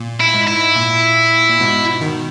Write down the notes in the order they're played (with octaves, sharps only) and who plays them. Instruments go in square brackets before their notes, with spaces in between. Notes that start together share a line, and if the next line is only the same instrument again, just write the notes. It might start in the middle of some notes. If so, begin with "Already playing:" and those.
Already playing: [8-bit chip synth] A#2
[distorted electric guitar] E4
[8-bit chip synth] G#2
[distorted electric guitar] E4
[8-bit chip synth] A#2
A#2
G#2 B2
B2 D#3